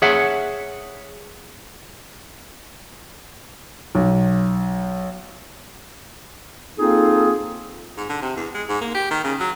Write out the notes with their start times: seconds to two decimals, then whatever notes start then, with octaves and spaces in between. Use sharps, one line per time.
0.02 G#4 C#5 E5 F#5
3.95 B1
6.79 A#3 C4 D#4 F4 G#4 A4
7.97 G#2
8.09 D3
8.22 C3
8.37 E2
8.54 G#3
8.69 G#2
8.81 A#3
8.95 G4
9.11 D#3
9.24 C#3
9.40 F#3